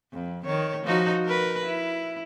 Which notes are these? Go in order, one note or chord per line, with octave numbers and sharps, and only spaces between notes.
F2
D#3 C#5
F3 D#4 F#4
A#4 B4
E4